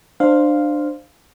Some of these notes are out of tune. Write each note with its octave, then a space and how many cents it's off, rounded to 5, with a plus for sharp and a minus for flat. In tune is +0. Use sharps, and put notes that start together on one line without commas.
D4 +25 C5 +0 F5 +0